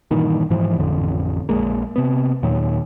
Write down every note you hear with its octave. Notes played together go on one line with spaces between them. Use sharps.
G2 A#2 D#3 E3
G#2 E3 F3
A1 F2 D3
A#1 G#3 A#3
C3 B3
D#2 A#2 D#3 F#3